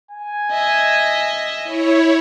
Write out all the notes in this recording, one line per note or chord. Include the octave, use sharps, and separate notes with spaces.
G#5
D#5 E5
E4 C#5